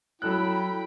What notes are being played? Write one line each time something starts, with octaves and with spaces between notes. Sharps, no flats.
F#3 E4 A4 G5 B5 F#6